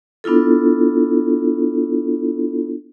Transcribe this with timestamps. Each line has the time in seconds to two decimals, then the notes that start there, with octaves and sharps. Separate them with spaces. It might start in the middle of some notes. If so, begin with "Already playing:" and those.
0.24 B3 D4 E4 F4 A4